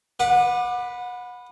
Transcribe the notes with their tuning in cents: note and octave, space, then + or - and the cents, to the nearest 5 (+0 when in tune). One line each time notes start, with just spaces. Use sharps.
B4 +0 F#5 -30 D6 +30